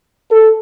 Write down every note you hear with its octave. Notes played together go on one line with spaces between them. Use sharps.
A4